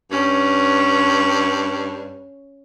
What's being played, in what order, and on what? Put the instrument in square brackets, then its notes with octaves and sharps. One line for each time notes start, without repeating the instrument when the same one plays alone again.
[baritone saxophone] G2 [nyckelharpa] C#4